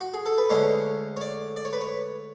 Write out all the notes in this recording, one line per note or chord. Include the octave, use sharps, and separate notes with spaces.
F#4
G#4
A4
B4
D2 D3 G#3 C#4 C#5
C#5
D5
D5
C#5
B4
C#5